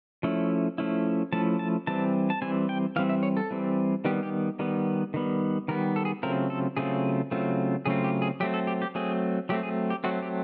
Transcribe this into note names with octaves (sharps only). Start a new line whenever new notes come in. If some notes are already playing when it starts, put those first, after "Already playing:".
F3 A3 C#4 E4
F3 A3 C#4 E4
F3 A3 C#4 E4 A5
A5
E3 G3 C4 A5
A5
E3 G3 C4 G#5
G5
E3 G3 C4 F5
E5
C#5
A4
E3 G3 C4
D#3 G3 B3 G4
G4
D#3 G3 B3
D#3 G3 B3
D#3 G3 B3 A#4
A4
G#4
C#3 F#3 A3 C4 F4 A#4
A4
C#3 F#3 A3 C4 F4 G#4
C#3 F#3 A3 C4 F4
C#3 F#3 A3 C4 F4 G#4
G4
G#4
F#3 A3 C4 G4
A4
G4
G4
F#3 A3 C4 G#4
F#3 A3 C4 G4
G#4
G4
F#3 A3 C4 F#4
G4